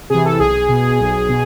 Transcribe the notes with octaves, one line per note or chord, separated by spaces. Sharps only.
C3 E3 G#4
A4
B1 G#4
B2
B1
B2